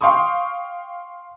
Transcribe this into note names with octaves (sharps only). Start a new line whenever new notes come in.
F5 G5 C6 C#6 D#6